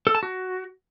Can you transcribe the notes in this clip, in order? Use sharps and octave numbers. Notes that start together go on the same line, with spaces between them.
A4
A5
F#4